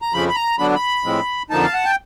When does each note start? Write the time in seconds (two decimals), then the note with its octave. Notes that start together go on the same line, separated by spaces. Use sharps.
0.02 A#5
0.13 F2 C#3 F3 B5
0.29 B5
0.35 A#5
0.59 D3 F#3 B3 D4 B5
0.75 B5
1.04 A2 F3 G#3 C4
1.50 F2 D3 F3 A#3 D#4 A5
1.63 F5
1.74 F#5
1.85 G5